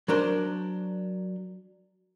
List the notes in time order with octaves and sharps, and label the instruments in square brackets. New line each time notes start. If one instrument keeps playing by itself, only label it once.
[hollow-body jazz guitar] F#3 D4 A#4 C5